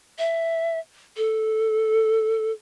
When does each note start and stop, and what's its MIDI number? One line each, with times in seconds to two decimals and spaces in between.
0.19 0.79 76
1.17 2.52 69